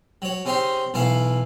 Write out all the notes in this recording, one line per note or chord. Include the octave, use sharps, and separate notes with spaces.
F#3 C#5
C#3 C4 D#4 G4 C6
B1 E3 E4 F5